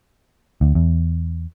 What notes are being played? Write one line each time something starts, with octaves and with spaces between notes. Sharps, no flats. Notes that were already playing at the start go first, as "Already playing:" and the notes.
D2
E2